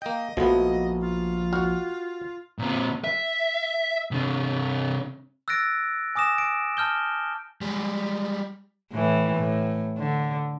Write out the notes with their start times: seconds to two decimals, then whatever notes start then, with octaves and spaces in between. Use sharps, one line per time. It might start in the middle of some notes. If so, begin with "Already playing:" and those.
0.02 A#3 D#5 G5
0.37 A#1 F3 A3 B3 F#4 D#5
1.00 F4
1.53 F#4 F#5 F6
2.59 A#2 C4
3.04 E5
4.11 C3 D4
5.48 E6 F#6 A6 A#6 D7
6.15 G#5 D6 D#6 A#6 E7
6.38 D7
6.77 A5 F6 G6 G7
7.61 G3 G#3
8.92 A2 E3
9.36 A2
9.99 D3